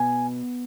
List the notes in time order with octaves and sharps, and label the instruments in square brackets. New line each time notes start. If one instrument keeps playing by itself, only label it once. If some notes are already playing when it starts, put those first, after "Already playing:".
Already playing: [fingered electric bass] B2 B3 [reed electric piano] G#5